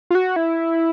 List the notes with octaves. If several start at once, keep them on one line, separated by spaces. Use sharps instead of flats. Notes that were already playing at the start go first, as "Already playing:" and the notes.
F4
F#4
E4